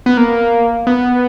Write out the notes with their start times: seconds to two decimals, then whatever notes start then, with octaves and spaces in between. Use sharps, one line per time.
0.06 B3
0.17 A#3
0.87 B3